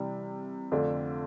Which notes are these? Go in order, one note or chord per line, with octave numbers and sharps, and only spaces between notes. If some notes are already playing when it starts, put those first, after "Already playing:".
Already playing: C3 E3 G3
F2 D3 A3 D4 F4